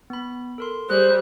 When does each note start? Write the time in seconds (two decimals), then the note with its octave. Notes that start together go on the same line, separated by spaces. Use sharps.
0.10 B3 B5
0.58 A4 A#4 C6
0.89 G3 G#4 C5 F#6